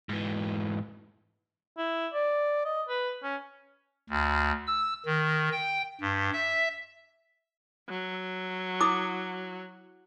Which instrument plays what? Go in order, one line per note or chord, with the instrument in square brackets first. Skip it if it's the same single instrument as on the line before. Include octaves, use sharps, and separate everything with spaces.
[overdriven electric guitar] G#2 E3
[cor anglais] E4
D5
D#5
B4
C#4
[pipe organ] D2
E6
D#3
G5
G2
E5
[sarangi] F#3
[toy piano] E4 D6 D#6